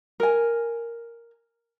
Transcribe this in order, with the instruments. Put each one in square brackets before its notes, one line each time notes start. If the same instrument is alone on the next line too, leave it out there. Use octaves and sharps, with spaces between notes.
[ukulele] A#4 G#5